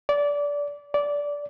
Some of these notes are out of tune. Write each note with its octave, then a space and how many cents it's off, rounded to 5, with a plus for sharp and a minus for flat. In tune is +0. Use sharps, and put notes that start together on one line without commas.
D5 -20
D5 -15